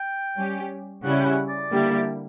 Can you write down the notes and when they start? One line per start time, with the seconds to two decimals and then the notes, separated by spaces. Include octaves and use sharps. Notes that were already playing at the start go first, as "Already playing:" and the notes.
Already playing: G5
0.37 G3 C#4 G4
1.03 C#3 G3 C#4 E4 F#5
1.20 G5
1.25 F#5
1.49 D5
1.70 D3 G3 A#3 E4 G4